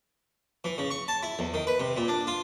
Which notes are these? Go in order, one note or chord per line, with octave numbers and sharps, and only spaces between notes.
E3
C#3
C#6
A5
E4
E2
D#3
B4
C3
A#2
D4
F4